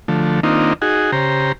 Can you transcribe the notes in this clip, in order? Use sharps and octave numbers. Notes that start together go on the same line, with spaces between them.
D3 F3 A3
D#3 A#3 C4 D4 D#4 F4
D#4 F#4 G#4
C#3 G4 C5 A#5